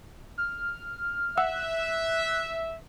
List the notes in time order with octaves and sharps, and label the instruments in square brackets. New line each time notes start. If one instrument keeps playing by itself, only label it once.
[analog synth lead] F6
[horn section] E5 [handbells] F#5 E6 [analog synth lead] F#6